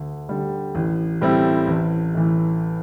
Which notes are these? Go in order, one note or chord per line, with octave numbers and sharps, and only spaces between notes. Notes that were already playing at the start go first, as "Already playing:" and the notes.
Already playing: D2
D3 G3
A1
A2 G3 C4 E4
A1
A2 E3